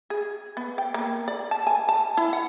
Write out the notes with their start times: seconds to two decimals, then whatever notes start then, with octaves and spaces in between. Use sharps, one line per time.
0.10 G#4
0.57 B3
0.78 G5
0.94 A#3
1.28 D5
1.51 A5
1.67 G#5
1.89 A5
2.17 E4
2.33 F#5